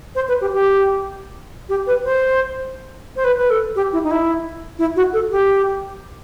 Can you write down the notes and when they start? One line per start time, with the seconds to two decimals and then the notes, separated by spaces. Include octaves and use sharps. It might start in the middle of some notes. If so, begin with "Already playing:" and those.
0.15 C5
0.28 B4
0.41 G4
0.53 G4
1.69 G4
1.87 B4
2.04 C5
3.16 C5
3.24 B4
3.38 B4
3.50 A4
3.76 G4
3.93 E4
4.04 D#4
4.11 E4
4.79 E4
4.96 F#4
5.13 A4
5.31 G4